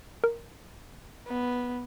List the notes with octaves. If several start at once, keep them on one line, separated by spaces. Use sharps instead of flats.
A#4
B3